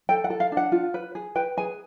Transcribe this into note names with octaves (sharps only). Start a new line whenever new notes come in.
A4 G5
F#5
A4
F5
D4
F#5
F4
B4
G#4
B4 G5
G#4 G#5